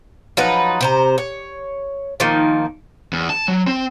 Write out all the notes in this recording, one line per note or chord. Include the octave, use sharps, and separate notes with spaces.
F3 F#3 D#4 B4
C3 C5 A#5
C#5
D#3 F3 A#3 D#4
E2
A5
F#3
C4